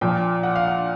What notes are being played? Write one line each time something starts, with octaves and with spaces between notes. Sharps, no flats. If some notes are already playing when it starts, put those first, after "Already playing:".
A#2 F3 G5
F#5
F5
F#5